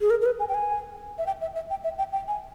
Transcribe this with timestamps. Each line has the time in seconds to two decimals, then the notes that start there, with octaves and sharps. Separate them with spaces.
0.01 G#4
0.10 A#4
0.21 A#4
0.26 B4
0.40 G#5
0.49 G5
0.54 G#5
1.18 E5
1.26 G5
1.41 E5
1.55 E5
1.70 G5
1.84 E5
1.98 G5
2.13 G5
2.28 G#5